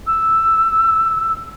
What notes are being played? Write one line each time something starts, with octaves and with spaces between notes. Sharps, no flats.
E6